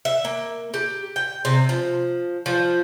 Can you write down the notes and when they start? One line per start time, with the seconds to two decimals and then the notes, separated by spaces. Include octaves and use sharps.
0.05 E5
0.25 A#3
0.74 G4
1.16 G5
1.45 C3
1.69 F3
2.46 F3